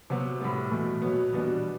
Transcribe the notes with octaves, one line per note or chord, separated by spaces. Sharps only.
C3 F#3 B3 F#4
A2 G3 B3
E2 B2 A3
B2 F#3 B3
E2 B2 G3 B3 D4